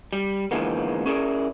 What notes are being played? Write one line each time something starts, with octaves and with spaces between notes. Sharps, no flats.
G3
D3 E3 F3 G#3 A#3 B3
C#4 E4 G#4 A#4 B4 D5